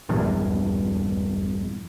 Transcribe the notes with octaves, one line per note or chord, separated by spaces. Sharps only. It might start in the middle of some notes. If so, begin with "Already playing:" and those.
D#1 A#1 E2 G2